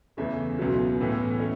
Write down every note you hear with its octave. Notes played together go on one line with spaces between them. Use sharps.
E2 C#3 E3 A3 E5
C#2 B2 F#3 B3
A2 E3 B3
A3 C#4